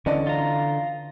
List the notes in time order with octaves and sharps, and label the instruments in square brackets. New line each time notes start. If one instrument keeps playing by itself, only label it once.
[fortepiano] E2 D5 D#5 [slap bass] D3 [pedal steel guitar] C#4
[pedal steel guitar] F4 A#5